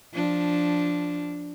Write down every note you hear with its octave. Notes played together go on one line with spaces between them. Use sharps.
F3 D4